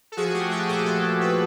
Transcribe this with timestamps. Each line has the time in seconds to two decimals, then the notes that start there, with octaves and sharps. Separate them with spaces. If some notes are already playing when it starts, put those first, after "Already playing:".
0.12 A4
0.17 F3 F#4 G#4
0.34 A3 G4
0.51 F3 F#4 G#4
0.68 A#2 G4 A4
0.86 F3 G4 A4
1.03 A3
1.21 A3 A4 B4